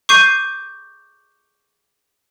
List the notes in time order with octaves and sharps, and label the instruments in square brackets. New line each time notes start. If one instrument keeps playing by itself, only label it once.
[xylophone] C#6 D6 G6 C7 D#7